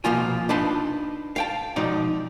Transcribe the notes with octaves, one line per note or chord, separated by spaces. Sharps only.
C2 B2 F3 A#3 F4 G#5
D4 D#4 B4 F5 A5 C6
F5 G5 A5
B2 F3 G#3 D#4 D5